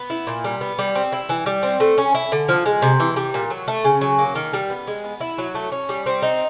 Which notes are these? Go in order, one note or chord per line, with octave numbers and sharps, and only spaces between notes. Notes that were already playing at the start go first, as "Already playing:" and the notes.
Already playing: B3
E4
A#2
G3
B3
G3
C4
E4
E3
G3
C4
A3
C#4
E4
D3
F3
G#3
C3
E3
G3
A#2
F#3
A3
C#3
F#3
A#3
D#3
G3
B3
G#3
B3
E4
F#3
A3
C#4
G3
C4
D#4